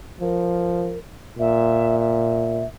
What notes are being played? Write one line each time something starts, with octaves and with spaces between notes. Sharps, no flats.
F3 A#4
A#2 E5
E5